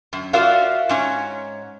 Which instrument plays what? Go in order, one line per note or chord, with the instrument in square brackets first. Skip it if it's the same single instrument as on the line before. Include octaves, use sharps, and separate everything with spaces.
[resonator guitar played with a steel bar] F#2
F4 F#4 A#4 D5 E5 F5
G#2 C#4 C#5